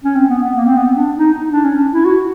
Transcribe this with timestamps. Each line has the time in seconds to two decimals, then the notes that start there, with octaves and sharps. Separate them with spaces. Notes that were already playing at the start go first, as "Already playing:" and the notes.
0.04 C#4
0.15 C4
0.29 B3
0.43 B3
0.56 A#3
0.66 C4
0.77 B3
0.87 C4
0.97 D4
1.17 D#4
1.38 D#4
1.52 D4
1.64 C#4
1.78 D4
1.92 E4
2.05 F#4